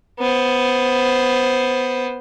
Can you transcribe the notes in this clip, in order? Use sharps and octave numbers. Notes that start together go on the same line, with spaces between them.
B3 C5